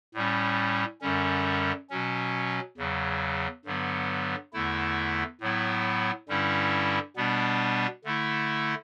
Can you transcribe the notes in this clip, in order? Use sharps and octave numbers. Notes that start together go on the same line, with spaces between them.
A2 G3 C#4
F#2 D3 G3 C#4
B2 F#3 C#4
E2 C#3 F#3
G2 D3 F#3 B3
E2 D3 A3 E4
A2 F#3 B3 E4
G2 D3 G3 C#4 E4
B2 G3 B3 D4
D3 A3 E4